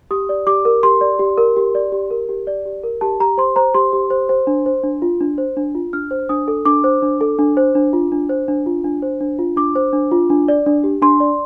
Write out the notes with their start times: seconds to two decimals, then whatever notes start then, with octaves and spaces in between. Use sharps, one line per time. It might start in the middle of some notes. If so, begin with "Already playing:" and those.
0.11 G4 D#6
0.29 D5
0.47 G4 D6
0.65 A#4
0.83 G4 C6
1.01 D5
1.19 G4
1.38 A#4
1.57 G4
1.75 D5
1.92 G4
2.11 A#4
2.29 G4
2.47 D5
2.66 G4
2.83 A#4
3.01 G4 A5
3.20 G4 A#5
3.38 C5 C6
3.56 C5 A#5
3.74 G4 C6
3.93 G4
4.10 C5
4.29 C5
4.47 D4
4.66 C5
4.84 D4
5.02 F4
5.21 D4
5.38 C5
5.57 D4
5.75 F4
5.93 D4 F6
6.11 C5
6.29 D4 D#6
6.48 A4
6.65 D4 D6
6.84 C5
7.02 D4
7.21 A4
7.39 D4
7.57 C5
7.75 D4
7.93 F4
8.12 D4
8.29 C5
8.48 D4
8.66 F4
8.84 D4
9.02 C5
9.21 D4
9.39 F4
9.56 D4 D6
9.75 C5
9.93 D4
10.11 F4
10.30 D4
10.48 D5
10.66 D4
10.84 G4
11.02 D4 C6
11.20 D5